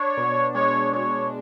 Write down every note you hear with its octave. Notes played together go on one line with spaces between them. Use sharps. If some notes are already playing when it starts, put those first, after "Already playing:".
Already playing: D4 C#5
B2
G#3 C#5
B2 C#5